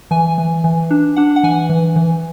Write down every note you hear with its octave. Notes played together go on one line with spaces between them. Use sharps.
E3 G#5
E3
E3
D4
D4 F#5
F#5
E3 G#5
E3
E3